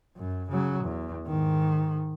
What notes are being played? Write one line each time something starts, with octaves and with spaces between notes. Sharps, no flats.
F#2
C#3 F#3
E2
G#2 D#3